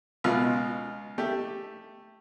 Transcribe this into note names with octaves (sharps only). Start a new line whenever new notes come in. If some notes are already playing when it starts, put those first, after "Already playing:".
C#2 B2 F4 F5
A3 G4